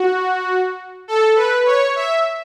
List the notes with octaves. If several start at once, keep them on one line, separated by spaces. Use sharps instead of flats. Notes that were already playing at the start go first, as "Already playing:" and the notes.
Already playing: F#4
A4
B4
C#5
E5